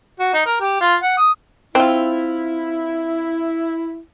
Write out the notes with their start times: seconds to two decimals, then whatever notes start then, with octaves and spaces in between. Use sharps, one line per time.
0.19 F#4
0.34 D#4
0.46 A#4
0.60 G4
0.81 F4
1.02 F#5
1.17 D#6
1.75 C4 E4 F4